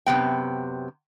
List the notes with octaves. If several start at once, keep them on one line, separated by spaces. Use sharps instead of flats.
F#2 C3 B3 G5